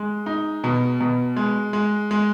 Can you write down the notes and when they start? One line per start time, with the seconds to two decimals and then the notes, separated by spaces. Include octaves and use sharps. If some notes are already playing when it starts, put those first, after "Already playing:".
Already playing: G#3
0.26 D#4
0.64 B2
1.00 B2
1.36 G#3
1.73 G#3
2.11 G#3